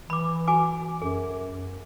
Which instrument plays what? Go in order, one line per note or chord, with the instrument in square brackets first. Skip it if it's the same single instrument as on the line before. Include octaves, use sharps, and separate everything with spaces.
[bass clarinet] E3 [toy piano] B5 D6
[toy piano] F#4 G#5 D6
[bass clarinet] F#2 [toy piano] G#4